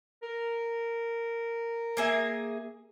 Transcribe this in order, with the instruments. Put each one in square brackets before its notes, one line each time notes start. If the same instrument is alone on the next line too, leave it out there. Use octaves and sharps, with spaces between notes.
[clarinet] A#4
[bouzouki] A#3 G#4 E5